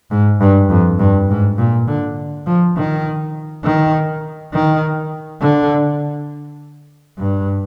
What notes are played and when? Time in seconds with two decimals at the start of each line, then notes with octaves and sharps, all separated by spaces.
0.11 G#2
0.41 G2
0.69 F2
0.99 G2
1.30 G#2
1.58 A#2
1.88 D3
2.46 F3
2.77 D#3
3.64 D#3
4.53 D#3
5.41 D3
7.18 G2